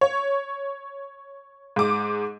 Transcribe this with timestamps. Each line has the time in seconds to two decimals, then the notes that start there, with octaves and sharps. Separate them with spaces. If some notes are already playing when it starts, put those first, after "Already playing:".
0.01 C#5
1.76 G#2 D6